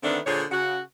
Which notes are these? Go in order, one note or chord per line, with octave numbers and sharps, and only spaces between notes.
D3 D#3 A3 B3 C4 D4
A#2 D3 G#4 C5 C#5
C#3 F#4